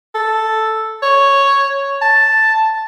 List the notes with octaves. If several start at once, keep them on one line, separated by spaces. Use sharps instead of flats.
A4
C#5
A5